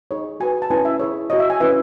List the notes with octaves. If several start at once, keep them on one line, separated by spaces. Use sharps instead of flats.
D#4 G#4 C#5
F#4 B4 G#5
A5
C#4 E4 B4 G#5
E5
E4 G#4 C#5
F#4 C#5 D#5
E5
G#5
C#4 E4 B4 E5